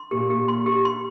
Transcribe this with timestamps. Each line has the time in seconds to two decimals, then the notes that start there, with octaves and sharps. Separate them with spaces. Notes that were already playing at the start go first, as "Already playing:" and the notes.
Already playing: C6
0.11 A#2 G4
0.30 G4
0.48 C6
0.66 G4
0.85 C6